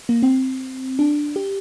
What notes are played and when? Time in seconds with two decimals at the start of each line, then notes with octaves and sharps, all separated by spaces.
0.09 A#3
0.23 C4
0.99 D4
1.36 G4